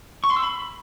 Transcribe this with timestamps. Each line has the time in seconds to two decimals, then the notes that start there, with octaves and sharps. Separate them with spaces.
0.24 C#6
0.30 C6
0.36 E6
0.43 B5